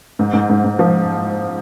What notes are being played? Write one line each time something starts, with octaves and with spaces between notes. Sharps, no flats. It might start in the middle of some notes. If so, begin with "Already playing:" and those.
G#2
G#2
G#2
G#2
F3